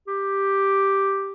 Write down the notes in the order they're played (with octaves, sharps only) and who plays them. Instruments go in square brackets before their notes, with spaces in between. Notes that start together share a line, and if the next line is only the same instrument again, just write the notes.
[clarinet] G4